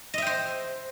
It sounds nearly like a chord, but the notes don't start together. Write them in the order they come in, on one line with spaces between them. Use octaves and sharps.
D#5 E5 G5 C5